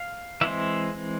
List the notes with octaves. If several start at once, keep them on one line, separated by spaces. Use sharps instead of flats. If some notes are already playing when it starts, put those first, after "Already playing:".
Already playing: F5
E3 G#3 C4 E5